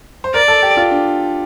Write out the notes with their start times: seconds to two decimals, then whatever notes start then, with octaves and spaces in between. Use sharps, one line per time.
0.24 C5
0.34 A#4 D5
0.48 A4
0.63 G4
0.77 F4
0.91 D4